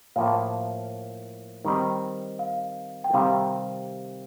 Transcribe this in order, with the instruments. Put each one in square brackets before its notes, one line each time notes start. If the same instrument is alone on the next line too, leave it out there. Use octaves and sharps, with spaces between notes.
[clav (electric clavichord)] A2 F3 A#3 [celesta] F5
[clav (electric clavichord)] D#3 G3 C4 [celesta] D#5
[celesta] F5
G5
[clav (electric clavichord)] C3 D#3 G3 C4 [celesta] F5